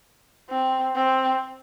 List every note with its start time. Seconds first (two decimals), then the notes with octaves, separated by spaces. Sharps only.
0.49 C4
0.95 C4